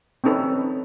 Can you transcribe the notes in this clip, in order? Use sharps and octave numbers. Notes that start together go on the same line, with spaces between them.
C4 C#4 D#4 A4 B4